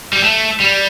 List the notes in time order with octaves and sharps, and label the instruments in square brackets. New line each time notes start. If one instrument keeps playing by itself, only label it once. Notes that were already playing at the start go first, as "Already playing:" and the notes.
[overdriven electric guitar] G3
A3
G3